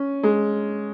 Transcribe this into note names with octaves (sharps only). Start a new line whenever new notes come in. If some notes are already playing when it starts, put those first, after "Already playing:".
Already playing: C#4
G#3